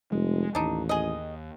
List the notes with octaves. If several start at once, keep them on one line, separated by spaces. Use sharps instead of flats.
F1 G#3
A1 D#2 D4 D#4
G#4 D#5